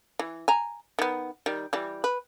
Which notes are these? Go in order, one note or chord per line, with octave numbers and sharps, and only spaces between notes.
E3
G#5 A#5
D#3 B3
D#3 G3
E3 G3
B4